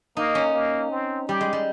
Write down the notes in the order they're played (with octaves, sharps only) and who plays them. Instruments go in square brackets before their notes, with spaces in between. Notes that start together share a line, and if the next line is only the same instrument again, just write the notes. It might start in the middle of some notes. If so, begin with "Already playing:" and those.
[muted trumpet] A#3 [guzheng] D#4
[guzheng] C#4
[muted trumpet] A#3
C4
[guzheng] G3 [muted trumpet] G4
[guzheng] G#3
G3